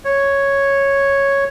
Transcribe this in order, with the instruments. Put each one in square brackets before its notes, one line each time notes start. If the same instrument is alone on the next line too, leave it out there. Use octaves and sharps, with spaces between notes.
[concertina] C#5